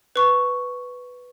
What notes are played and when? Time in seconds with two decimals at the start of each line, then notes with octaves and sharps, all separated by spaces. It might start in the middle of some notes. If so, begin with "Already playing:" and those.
0.16 B4 C#6